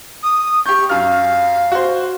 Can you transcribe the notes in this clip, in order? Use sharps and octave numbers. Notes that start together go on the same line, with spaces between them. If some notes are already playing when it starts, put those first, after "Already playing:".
D#6
G4 C#6 G6
F#2 F5 F6
F#4 C5